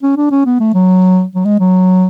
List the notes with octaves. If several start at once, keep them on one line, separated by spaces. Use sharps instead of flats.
C#4
D4
C#4
B3
A3
F#3
F#3
G#3
F#3